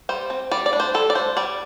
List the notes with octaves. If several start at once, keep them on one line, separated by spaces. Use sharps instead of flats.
G3 C5
C4
G3 D5
D5
D4
C5
G3 A4
D5
D4 C5
G3 D5